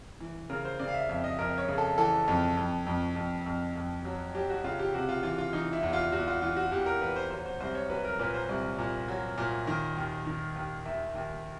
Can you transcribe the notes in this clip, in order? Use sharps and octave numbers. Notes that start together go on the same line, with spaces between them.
E3
C#3 A#4
C5
C#3 D5
F5
E5
F2 E5
D#5
F2 A#4
C#5
C#3
A4
E3 A4
F2
F2
F2
F2
F2
F2
F#3
F#3 G4
F#4
C#3 F4
G4
C3 F#4
F4
E3 F4
F4
E3 D#4
E4
E2
F4
E2 F#4
F4
E3 F4
F#4
E2 G4
A#4
E2 B4
C5
F#3 C5
C5
C2 C5
C#5
F#3 B4
A#4
A#2 B4
C5
C2
A#2
F#3
A#2
D#3
D#2
D#3
D#2
D#2 E5
D#2